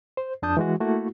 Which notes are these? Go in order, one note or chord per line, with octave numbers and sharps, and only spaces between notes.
C5
F2 D4 A5 D#6 G6
E3 G#3 F#4
A3 A#3 E4 F#4